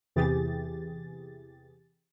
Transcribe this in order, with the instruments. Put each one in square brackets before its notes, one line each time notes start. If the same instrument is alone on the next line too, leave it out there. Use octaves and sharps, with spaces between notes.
[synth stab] E2 C3 E3 G4 G#4 A6